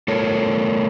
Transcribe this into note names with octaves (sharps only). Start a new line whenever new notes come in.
A3 A4 A#4 C#5